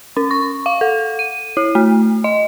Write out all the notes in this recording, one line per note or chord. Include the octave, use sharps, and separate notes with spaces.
C#4
C#6
F5
A4
D#7
E4
A3
D#5